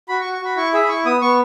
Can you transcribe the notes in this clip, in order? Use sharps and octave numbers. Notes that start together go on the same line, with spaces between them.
F#4 B5
C#6
F#4
C#6
F#4 B5
E4 C#6
G#4 E5
B5
E4 C#6
B3 D#6
B3 C#6